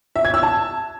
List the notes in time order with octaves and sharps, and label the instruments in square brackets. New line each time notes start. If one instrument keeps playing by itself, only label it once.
[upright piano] E5
G#6
E6
A5